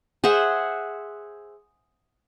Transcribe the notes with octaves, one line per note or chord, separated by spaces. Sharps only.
G#4 C5 E5 F#5